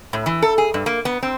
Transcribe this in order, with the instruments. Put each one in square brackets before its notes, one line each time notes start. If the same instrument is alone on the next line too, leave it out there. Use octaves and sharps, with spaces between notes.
[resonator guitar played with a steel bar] A2
E3
A4
G#4
G2
A#3
B3
C4